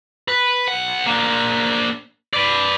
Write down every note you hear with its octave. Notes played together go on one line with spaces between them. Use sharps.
B4
B1 F#5
A#3 D4
B4 D5